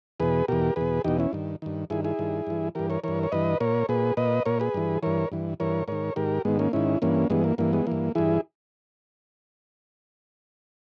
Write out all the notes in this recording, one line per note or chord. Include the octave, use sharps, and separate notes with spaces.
E2 B2 G#4 B4
E2 B2 G4 A#4
E2 B2 G#4 B4
E2 B2 D#4 G4
C#4 E4
G2 D#3
G2 D#3
G2 D#3 E4 G#4
E4 G#4
G2 D#3
G2 E3
G2 E3 G4 A#4
A#4 C#5
G2 E3 A#4 C#5
C#5
G2 E3 B4 D#5
A#2 A#4 C#5
A#2 G#4 B4
A#2 B4 D#5
A#2 A#4 C#5
G#4 B4
G2 E3
G2 E3 A#4 C#5
G2 E3
G2 E3 A#4 C#5
G#2 D#3 A#4 C#5
G#2 D#3 G4 A#4
G#2 D#3 G#3 B3
A#3 C#4
G#2 D#3 C#4 E4
G2 E3 A#3 C#4
G2 E3 G#3 B3
A#3
G2 E3 A#3
G#3 B3
G2 E3 A#3
G2 E3 E4 G#4